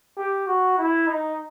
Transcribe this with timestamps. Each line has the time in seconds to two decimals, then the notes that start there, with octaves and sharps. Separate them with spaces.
0.17 G4
0.47 F#4
0.78 E4
1.07 D#4